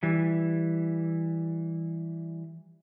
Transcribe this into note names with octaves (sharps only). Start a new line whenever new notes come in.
E3 G3